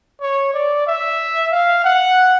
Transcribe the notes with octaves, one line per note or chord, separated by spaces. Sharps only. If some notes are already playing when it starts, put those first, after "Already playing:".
C#5
D5
E5
F5
F#5